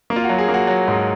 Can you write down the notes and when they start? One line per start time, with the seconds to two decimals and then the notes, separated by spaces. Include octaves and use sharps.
0.10 A#3
0.16 F4
0.24 F#4
0.29 F#3
0.38 G#4
0.49 A#3
0.54 F#4
0.67 F#3
0.88 G#2